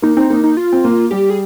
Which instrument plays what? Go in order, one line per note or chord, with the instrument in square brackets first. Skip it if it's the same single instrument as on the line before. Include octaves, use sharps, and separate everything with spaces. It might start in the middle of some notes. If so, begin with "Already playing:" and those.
[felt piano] A#3 [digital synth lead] D#4
[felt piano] C4 [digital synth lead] D#4
[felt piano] A#3 [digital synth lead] D#4
[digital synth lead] D#4
F4
[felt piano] C4
A#3
[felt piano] G3 [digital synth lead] G4
[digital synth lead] G#4